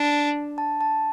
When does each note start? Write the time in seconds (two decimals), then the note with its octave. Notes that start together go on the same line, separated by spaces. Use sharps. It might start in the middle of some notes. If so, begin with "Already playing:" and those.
Already playing: D4
0.58 A5
0.81 A5